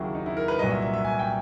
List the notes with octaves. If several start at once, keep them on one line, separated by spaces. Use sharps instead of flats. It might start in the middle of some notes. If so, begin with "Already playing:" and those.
Already playing: D#2 C#3 F#3 E4
D#4
E4
A#4
B4
C2 A#2 F#3 D#5
E5
E5
E5
G#5
G5